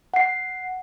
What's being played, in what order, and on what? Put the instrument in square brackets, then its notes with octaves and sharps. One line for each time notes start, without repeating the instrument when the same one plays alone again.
[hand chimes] F#5 C7